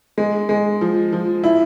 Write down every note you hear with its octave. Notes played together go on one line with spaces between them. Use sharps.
G#3
G#3
F3
F3
E4